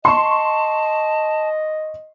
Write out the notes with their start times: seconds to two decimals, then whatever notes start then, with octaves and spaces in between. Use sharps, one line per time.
0.05 D#5 A5 C6 C#6